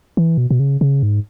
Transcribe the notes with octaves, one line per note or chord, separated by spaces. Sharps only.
E3
B2
B2
C#3
C#3
G#2